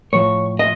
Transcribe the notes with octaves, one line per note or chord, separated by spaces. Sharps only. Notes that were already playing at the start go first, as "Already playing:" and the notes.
A2 F3 C#5
D#5